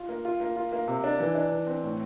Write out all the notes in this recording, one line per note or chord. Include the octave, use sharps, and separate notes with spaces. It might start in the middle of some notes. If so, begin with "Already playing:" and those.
Already playing: F4
A#3
F4
A#3
F4
A#3
C3
D4
E3
D4
E3
C4
A2